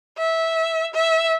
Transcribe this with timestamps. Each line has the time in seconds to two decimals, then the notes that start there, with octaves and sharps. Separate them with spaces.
0.18 E5
0.94 E5